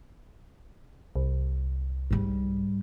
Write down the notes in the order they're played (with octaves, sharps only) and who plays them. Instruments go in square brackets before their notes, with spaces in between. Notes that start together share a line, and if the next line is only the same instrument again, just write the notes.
[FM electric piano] C2
[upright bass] G#2 G3